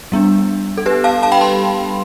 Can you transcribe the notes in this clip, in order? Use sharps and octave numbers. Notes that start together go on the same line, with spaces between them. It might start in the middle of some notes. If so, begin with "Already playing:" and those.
G3 B3 D4
A4
G4 B4
F5 A5
F5 A5
G5 B5
A5 C6